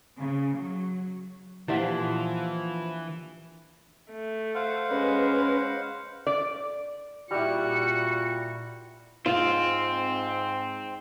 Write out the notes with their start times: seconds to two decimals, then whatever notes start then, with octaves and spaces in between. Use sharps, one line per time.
0.19 C#3
0.56 F#3
1.68 A#2 E3 F3 D4 E4 G4 E5 F#5
4.11 A3
4.55 C5 F5 F#5
4.91 G#3 C#4 B4
6.27 D5
7.31 A#2 G3 E4 F#4 C#7
9.26 G#2 C4 F4